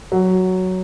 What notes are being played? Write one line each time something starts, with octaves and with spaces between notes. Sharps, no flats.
F#3